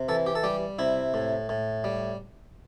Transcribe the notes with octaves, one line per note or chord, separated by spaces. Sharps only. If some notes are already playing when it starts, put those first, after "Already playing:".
Already playing: C3
E3 A4
G4
A4
G3 G4
C3 E4
A2
A2
G3